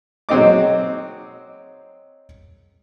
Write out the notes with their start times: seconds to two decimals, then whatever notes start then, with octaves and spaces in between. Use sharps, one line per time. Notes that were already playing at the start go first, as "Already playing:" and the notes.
0.29 F#3 G#3 C4 D#4 D#5 D6